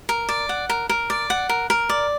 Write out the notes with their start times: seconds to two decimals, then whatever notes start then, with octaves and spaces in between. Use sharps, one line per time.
0.09 A#4
0.29 D5
0.49 F#5
0.69 A#4
0.89 A#4
1.10 D5
1.30 F#5
1.49 A#4
1.70 A#4
1.89 D5